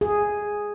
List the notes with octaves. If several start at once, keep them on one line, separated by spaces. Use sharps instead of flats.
G#4